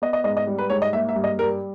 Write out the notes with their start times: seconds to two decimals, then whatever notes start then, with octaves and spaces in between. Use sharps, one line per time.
0.02 B3 D#5
0.13 D#5
0.24 G#2 D#5
0.37 D#5
0.47 G3
0.59 B4
0.70 G#2 C#5
0.82 D#5
0.93 A#3 E5
1.09 E5
1.16 G2
1.24 D#5
1.39 G3 A#4